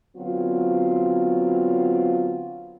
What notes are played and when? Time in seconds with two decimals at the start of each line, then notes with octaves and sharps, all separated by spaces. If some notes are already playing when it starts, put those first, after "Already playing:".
0.16 D3 F#3 B3 C4 F4